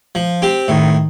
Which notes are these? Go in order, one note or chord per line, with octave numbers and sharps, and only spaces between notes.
F3
C4 G4
A2 D#3